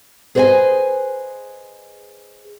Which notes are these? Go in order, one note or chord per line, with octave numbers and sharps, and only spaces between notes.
G#4 B4 C5 D5 D#5 G#5